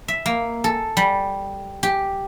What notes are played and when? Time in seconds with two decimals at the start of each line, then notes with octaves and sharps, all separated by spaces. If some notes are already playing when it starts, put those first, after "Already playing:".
0.08 E5
0.26 A#3
0.64 A4
0.97 G3
1.83 G4